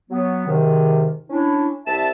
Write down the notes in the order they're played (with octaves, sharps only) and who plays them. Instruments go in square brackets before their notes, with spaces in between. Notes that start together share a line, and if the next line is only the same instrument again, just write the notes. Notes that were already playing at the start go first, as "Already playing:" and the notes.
[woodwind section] F#3 B3
G#2 C3 D#3
C#4 D4 E4
C2 E5 A5